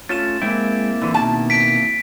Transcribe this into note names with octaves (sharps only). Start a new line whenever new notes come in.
A3 C#4 F4 A6 E7
G#3 A#3 C4 E4 G5
D3 E3
B2 D#3 A5
B6 D7